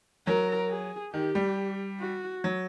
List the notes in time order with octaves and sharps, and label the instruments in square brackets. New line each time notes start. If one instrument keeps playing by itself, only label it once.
[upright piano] F#3 [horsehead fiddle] A#4
[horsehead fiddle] G#4
[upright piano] D#3 [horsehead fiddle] G4
[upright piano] G3
[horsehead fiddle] F#4
[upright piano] F#3